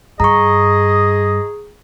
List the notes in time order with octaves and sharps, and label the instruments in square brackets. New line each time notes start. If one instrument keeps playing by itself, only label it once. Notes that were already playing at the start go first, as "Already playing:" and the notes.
[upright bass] G2 [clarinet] G#4 [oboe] D#5 [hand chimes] A#5 C#6